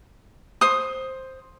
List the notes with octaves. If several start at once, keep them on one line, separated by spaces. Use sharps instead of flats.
C5 D#6